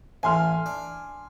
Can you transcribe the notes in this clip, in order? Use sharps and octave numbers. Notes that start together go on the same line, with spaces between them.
A1 A2 G#5 C6 F6
D4